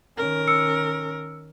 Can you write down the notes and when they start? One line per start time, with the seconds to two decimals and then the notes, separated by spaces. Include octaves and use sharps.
0.17 D#3 C#4 A#4
0.48 E6 C#7